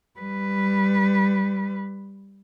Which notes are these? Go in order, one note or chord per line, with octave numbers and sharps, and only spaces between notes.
G3 B4